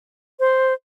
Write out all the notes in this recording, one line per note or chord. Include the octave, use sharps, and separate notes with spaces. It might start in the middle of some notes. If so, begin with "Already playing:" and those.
C5